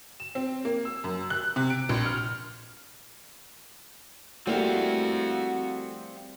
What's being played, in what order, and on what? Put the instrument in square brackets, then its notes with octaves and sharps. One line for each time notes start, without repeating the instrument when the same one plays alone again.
[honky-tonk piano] E7
C4
A#3
E6
F#2
F#6
C3
D7
A#1
F6
[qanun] G3 E4 [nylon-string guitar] A3 A#3 G4 [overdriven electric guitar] C4 F5 [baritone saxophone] F#4